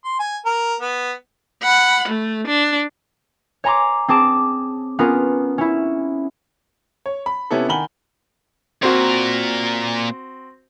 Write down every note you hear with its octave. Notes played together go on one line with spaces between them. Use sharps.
C6
G#5
A#4
B3
F#5 B5
A3
D4
C#5 G#5 A#5 C6 D6
C4 G#4 A5 D6 D7 E7
B3 C#4 F4 G#4 A#4 G#5
C#4 E4
C#5
B5
C3 B3 C#4 E4 G4 A4
D#3 F#5 G#5 B5 F#7 G7
A#2 C4 F#4 A#4